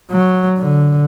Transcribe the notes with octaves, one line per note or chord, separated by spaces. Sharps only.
F#3
D3